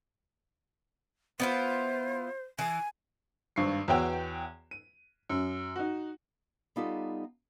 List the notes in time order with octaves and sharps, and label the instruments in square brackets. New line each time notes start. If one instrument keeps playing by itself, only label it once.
[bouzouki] B3 E4 F4 [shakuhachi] C5
[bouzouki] E3 [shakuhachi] G#5
[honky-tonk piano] G#1 G2 C#6 C7
E2 B3 F#4 C#5 G5 E6
D#7
F#2
D#4 F#4
[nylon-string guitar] G3 B3 D#4 F4 G4 A4